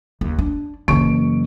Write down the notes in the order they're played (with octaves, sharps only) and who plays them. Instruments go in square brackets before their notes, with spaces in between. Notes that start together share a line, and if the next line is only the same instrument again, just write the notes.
[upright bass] D#2
D4
[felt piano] F#1 C#6 D7 [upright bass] E3 F#3